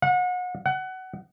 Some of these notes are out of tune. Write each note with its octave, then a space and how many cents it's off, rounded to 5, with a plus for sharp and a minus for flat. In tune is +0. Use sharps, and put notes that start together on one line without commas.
F#5 -35
F#5 +20